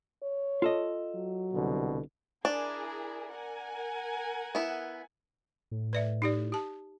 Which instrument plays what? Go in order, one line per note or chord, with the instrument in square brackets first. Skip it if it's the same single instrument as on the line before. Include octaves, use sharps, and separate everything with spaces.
[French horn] C#5
[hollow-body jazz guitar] F4 A4 D#5
[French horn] F#3
[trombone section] C2 B2 D3
[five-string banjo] D4 [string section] E4 G#4 A#4
[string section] A#4 F#5 G#5
[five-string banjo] B3 E4
[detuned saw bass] A2
[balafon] B4 D5 E5
D#4 G4 D5
G4 A5